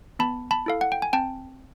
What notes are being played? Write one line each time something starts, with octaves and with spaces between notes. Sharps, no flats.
B3 A5 B5
A5 B5
E4 A4 F5
F#5
G5
G#5
C4 G5 A5